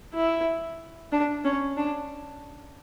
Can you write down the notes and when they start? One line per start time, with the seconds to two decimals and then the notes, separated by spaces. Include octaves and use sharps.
0.13 E4
1.12 D4
1.44 C#4
1.77 D4